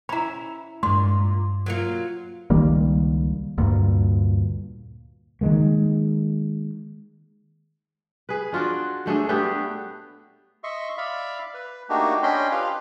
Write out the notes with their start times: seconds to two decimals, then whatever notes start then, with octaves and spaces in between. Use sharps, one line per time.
0.09 C#4 E4 A#5 B5
0.83 G2 A#2 G#3 C6
1.66 F#3 A#3 F4
2.50 C#2 D#3 G3 A#3
3.58 D2 G2 A#2
5.41 D#3 F#3 G#3 A#3
8.29 G#4 B4
8.53 D4 F4 F#4 D5
9.06 F#3 A3 D4 G#4
9.29 A3 B3 D4 G4
10.64 D#5 E5 C6 C#6
10.98 D5 E5 F5 B5
11.54 B4
11.89 A3 A#3 D4 D#4 F#4 G4
12.23 C#4 D4 D#5 G5 B5 C6
12.52 F4 G4 B4 F5